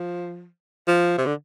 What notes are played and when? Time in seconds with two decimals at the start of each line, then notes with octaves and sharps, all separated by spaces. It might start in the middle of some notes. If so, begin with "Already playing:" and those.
Already playing: F3
0.88 F3
1.18 C3
1.26 D3